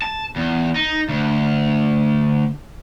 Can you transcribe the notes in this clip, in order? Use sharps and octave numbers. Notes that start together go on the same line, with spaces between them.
A5
E2
D#4
D2